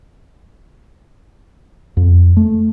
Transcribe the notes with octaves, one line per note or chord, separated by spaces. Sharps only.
F2
A3